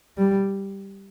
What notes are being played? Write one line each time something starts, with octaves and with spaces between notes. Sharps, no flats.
G3